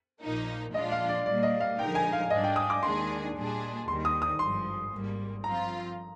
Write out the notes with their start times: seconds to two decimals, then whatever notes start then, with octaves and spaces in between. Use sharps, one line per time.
0.22 A#1 A#2 F3 A#3 D#4
0.74 A#2 F3 G#3 D4 F4 D#5
0.92 F5
1.08 D5
1.26 A#2 G3 A#3 D5
1.43 D#5
1.61 F5
1.78 D3 F3 G#3 D#4 A#4 G5
1.95 G#5
2.13 F5
2.30 G#2 G3 D4 D#5
2.44 G5
2.56 D#6
2.70 D6
2.83 D#2 D#3 G#3 D4 G#4 C6
3.35 A#2 G3 D4 G#4
3.87 D#2 D#3 G3 C6
4.05 D#6
4.22 D#6
4.39 G#1 G2 F3 C6
4.92 G#1 G#2 G3 A#3
5.44 G2 F3 C4 F4 A#5